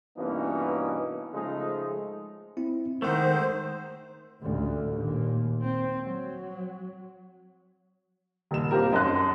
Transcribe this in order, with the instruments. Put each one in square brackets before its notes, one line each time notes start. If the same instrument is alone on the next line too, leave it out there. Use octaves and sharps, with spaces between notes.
[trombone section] G2 B2 E3 A#3 C#4 D#4
C#3 F3 G#3 A3 C#4 D#4
[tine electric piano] C4 E4
[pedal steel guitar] D#3 G#3 A3 [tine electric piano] A#4 F#5 [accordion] C5
[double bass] A1 D2
D#2 A#2
C4
F#3
[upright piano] D#1 E7
A#3 C4 F4 G4 A#4
B1 F#2 D#5 A5 C6 F#6